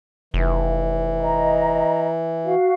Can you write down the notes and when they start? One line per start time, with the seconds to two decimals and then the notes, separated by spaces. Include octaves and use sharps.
0.34 F1 E3
1.21 D#5 A#5
2.44 F#4 F5